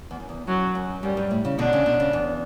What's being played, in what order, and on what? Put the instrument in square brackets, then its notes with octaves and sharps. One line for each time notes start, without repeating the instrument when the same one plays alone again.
[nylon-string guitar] E2
F#2
E2
[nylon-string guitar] F#2 [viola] F#3
[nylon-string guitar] F#2
[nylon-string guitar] F#2 [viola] G3
[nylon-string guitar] G2
A2
C#3
[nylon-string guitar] B2 D3 [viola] D4
[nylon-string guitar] C#3
B2
C#3
E2